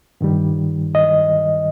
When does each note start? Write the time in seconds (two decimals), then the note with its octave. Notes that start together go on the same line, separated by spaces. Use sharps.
0.21 G2 D#3 G3
0.95 D#5